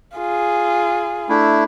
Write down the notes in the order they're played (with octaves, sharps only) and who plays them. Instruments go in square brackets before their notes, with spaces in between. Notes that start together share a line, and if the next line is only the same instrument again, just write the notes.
[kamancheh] F4 G#4
[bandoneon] A3 D4 E4